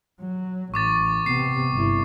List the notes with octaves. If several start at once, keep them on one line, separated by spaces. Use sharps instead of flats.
F#3
A1 C#6 D6 A6
C3 B3 C7
G1 E4